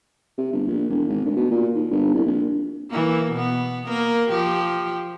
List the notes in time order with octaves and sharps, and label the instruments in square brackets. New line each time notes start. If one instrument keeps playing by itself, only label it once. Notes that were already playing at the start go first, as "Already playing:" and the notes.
[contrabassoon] C3
G1
A#1
E1
G#1
D2
B2
A#2
D#2
G1
C2
A#1
[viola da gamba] E3 A#3
B2 B3
A#3 A#4
F3 G4